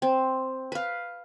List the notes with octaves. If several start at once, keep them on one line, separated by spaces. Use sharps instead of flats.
C4
B4 F5